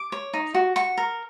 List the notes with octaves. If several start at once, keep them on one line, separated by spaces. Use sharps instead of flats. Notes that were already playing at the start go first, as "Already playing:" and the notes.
Already playing: D6
C#5
D#4
F#4
F#4 C#6
A#4